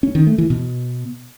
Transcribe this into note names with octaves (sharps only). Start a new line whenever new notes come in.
C#4
D#3
A3
E3
B2